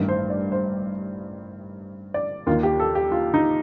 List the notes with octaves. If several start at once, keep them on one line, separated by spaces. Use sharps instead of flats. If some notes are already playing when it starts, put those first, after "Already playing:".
Already playing: A1 G2 D#3
C5
D5
C5
D5
D#2 D#3 F4
G4
A4
G4
F4
D#4